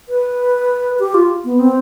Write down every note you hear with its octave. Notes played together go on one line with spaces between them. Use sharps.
B4
G4
F4
B3
C4